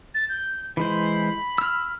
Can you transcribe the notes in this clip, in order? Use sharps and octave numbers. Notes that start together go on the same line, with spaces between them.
A6
G6
E3 G#3 C5 B5
E6 F6